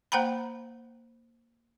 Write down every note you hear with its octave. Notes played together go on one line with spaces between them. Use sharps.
A#3 C5 F#5 G5 A#5 B5